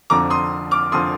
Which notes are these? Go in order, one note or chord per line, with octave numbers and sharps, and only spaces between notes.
F1 F2 D3 F3 A#5 D6
C6 D#6
D6 F6
F1 D3 F3 C6 D#6